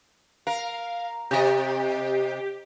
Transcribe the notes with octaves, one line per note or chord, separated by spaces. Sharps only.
A#4 F5
C3 G4 D#5